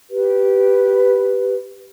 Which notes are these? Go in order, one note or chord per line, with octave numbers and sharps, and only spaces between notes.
G4 B4